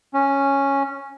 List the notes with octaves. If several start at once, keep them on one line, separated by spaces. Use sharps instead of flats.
C#4